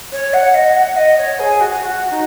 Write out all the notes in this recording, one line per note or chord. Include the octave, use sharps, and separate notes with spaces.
C#5
F#5
D#5
F#5
D#5
C#5
G#4
F#4
F#4
D#4